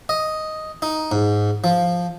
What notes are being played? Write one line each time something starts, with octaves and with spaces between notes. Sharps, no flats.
D#5
D#4
G#2
F3